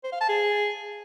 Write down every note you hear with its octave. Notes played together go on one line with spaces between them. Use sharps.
C5
F5
A5
G#4